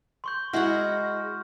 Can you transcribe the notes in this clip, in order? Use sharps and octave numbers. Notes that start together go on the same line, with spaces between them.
C6 C#6 G6
G#3 E4 F#4 F#5 F6 F#6